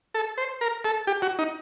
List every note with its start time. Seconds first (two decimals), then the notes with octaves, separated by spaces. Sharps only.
0.14 A4
0.38 C5
0.61 A#4
0.84 A4
1.07 G4
1.22 F#4
1.39 D#4